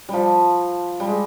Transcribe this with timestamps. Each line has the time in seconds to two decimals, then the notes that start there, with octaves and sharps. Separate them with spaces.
0.09 F3 G3
1.00 G3
1.07 G#3